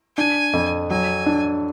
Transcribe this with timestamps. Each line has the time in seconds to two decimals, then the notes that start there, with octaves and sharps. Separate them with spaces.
0.17 D4 G#5
0.53 F2
0.90 F#3 G#5
1.26 D4